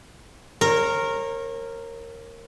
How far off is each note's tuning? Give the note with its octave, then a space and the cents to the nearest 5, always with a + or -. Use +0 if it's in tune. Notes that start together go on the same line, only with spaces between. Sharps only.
A#4 -10 C#5 -35